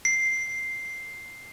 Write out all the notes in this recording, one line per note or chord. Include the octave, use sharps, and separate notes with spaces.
C7